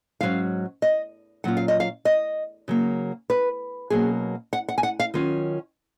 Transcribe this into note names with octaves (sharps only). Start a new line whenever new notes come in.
G#2 F#3 C#4 F5
D#5
A#2 F#3 C#4 F4 F#5
F5
D#5
F5
D#5
C#3 F#3 A#3
B4
B2 F#3 A#3 C#4 G#4
F#5
F#5
G#5
F#5
F5
D#3 F#3 C#4 F4